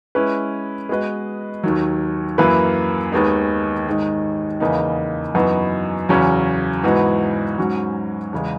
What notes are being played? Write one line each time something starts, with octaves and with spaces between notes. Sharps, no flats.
G#3 C#4 E4 B4
G#3 B3 F#4 B4 D#5
D#2 D#3 F#3
F#2 E3 A#3 E4 B4
D#2 D#3 G#3 B3 D#4
G#2 D#3 G#3 D#4
E2 C#3 E3 A#3 D#4
F#2 E3 B3 D#4 F#4
E2 C#3 F#3 C#4
G#2 E3 B3 D#4 F#4
G#2 F#3 C#4 F#4
E2 C#3 G#3